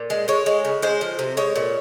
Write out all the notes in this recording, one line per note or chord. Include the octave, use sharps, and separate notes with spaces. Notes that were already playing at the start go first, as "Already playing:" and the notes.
Already playing: A#2
G#3
G#3 C#5
G#3
C#3
G#3 C5
F3
C3
G#3 C#5
A#2